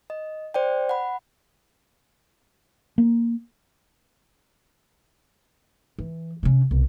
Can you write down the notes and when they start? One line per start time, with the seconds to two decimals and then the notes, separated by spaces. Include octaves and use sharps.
0.10 D#5
0.54 C5 D5 G5
0.89 F#5 B5
2.98 A#3
5.98 E3
6.43 C3 C#4
6.71 C2 B2